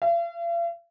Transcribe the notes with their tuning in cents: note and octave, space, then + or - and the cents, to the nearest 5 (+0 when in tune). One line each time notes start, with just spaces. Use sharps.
F5 -45